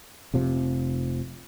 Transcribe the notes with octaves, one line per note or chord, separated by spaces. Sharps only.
F1 C3 F3